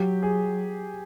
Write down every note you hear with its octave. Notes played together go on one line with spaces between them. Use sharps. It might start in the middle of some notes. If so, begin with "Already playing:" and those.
Already playing: F#3 G4
G#4